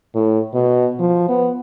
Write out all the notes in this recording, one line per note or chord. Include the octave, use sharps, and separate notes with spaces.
A2
B2
F3
B3